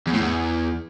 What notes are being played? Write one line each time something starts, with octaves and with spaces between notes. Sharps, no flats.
E2
A2
E2